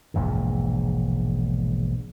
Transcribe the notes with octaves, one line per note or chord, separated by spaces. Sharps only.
E1 A#1 E2 G#2